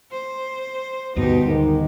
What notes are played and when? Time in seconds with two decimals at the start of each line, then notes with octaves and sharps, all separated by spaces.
0.11 C5
1.16 D2 G2 B2 D#4 G4
1.46 G#2 D#3